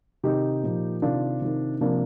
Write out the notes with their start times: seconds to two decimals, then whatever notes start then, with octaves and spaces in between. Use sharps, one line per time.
0.23 C3 D#3 D#4 G4
0.63 A#2 F3
1.02 C3 D#3 D4 F4
1.42 C3 D#3
1.81 C3 F3 A#3 D4